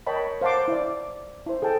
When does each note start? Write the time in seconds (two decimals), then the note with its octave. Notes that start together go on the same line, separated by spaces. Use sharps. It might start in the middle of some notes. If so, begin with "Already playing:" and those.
0.07 A#4 C#5 D#5 G5 A5 B5
0.41 C5 F5 F#5 A5 C6 D6
0.68 E4 D5
1.46 E4 C5
1.62 G#4 A4 G5 A5